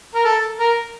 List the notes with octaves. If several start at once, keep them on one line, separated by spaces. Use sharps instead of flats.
A#4
A4
A#4